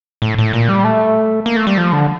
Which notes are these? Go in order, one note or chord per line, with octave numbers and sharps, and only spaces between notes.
A2
A2
A#2
G3
A3
A#3
A3
G3
F3
D3